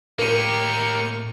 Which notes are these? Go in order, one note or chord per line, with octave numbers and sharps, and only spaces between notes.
A2 A#3 G4 A#4 C#6 D#7